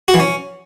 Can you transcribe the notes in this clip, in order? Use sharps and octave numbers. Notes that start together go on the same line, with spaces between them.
F#4
E3
C#4